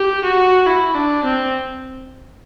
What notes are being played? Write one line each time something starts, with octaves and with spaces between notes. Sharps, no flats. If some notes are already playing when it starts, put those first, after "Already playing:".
Already playing: G4
F#4
E4
D4
C4